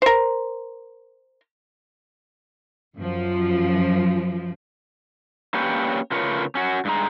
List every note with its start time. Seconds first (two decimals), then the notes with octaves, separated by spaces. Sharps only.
0.02 A#4 C5
2.96 F#2 F3
5.54 A#3 C#4 D4 G4 B4 C#5
6.12 C#3 A3 F4 A#4 B4 C#5
6.55 C#4 F#4
6.85 G2 G#3 A#5